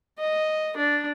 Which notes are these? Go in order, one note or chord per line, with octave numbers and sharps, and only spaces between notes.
D#5
D4